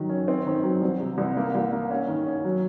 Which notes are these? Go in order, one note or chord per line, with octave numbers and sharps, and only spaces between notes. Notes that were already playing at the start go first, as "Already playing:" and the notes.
Already playing: D#3 F#3
C#4
C4
D#3
F#3
C2
C3
C2
A#3
C2
A#3
C#4
D#3
C#4
F#3